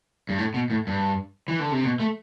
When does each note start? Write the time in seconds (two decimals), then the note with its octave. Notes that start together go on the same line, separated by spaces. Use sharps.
0.29 G2
0.38 A2
0.54 B2
0.70 A2
0.87 G2
1.48 E3
1.59 D3
1.71 C3
1.84 B2
2.00 A3